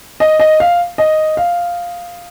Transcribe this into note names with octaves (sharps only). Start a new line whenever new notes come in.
D#5
D#5
F5
D#5
F5